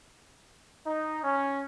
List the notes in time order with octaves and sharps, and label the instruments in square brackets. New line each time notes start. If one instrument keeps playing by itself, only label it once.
[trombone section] D#4
C#4